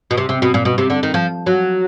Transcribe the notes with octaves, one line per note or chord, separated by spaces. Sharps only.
B2
C3
C3
B2
A#2
B2
C3
D3
D#3
F3
F#3